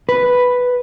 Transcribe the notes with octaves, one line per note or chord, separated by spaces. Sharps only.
B4